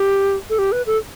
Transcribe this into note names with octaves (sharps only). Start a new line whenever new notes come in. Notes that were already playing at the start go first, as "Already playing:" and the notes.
Already playing: G4
A4
G4
B4
A4